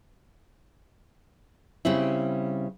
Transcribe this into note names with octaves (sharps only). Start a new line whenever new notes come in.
C#3 G3 C4 E4